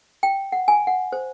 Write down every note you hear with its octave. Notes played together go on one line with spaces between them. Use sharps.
G5
F#5
G#5
F#5
C5